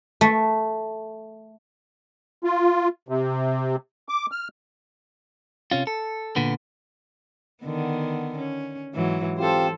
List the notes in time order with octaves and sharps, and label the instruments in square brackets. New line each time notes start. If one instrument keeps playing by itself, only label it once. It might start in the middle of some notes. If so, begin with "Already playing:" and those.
[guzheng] A3
[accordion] F4
C3
D6
F6
[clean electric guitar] C3 C#4 F4
A4
A#2 D3 B3
[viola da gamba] D3 D#3 B3
C#4
G#2 E3 F#3
[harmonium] C4 F4 G4 [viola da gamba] A4 C5